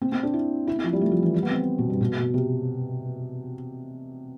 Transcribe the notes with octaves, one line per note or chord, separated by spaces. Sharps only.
C4
C4
D4
E4
E4
C4
F3
G3
A3
F3
E3
G3
B3
C4
B2
G2
B2
B2
C3